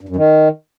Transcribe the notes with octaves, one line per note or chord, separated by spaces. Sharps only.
G2
F#2
D#3